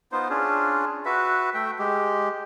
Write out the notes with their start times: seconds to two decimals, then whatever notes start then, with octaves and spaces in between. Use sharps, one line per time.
0.12 B3 D#4 F4 C5
0.30 C#4 D4 F4 G#4
1.05 F#4 B4 E5
1.54 A3 E5 G5
1.79 G#3 G4